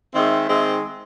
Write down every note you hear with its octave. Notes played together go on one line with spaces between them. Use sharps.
D#3 G#3 C4 E5
D#3 G#3 C4